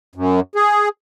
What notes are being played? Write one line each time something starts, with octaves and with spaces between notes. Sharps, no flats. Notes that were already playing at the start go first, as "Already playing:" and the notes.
F#2
G#4